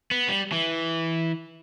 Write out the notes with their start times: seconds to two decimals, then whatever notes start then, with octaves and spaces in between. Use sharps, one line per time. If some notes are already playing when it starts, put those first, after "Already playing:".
0.11 B3
0.29 G3
0.52 E3